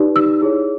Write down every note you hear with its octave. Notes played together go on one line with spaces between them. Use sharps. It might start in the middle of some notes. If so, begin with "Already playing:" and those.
Already playing: D#4 G4 B4 D5
E6
E4 G#4 C#5